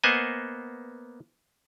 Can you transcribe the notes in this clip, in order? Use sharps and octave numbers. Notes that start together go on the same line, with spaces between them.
A#3 B3 C5 D#5 F#5 G#5